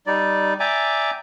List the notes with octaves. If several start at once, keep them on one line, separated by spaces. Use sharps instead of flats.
G3 D#4 D5
D5 E5 G5 G#5 A#5 D6